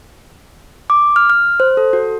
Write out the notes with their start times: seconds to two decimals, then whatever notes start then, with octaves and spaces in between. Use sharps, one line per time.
0.90 D6
1.16 F6
1.30 F6
1.60 C5
1.77 A4
1.93 F#4